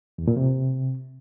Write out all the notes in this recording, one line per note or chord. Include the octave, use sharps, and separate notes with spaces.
E2
A#2
C3